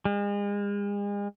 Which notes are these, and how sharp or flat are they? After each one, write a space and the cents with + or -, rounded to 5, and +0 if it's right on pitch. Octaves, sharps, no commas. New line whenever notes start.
G#3 -40